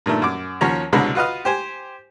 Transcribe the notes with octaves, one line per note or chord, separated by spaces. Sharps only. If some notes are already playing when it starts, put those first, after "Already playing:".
G2 A#2 D#3 A3
F#2 D6
D#2 F3 C#4 F#4 C#5 A#5
C2 B2 D3 F#3 G#3 B5
F4 F#4 B4 D#5 F5
G4 C5 G#5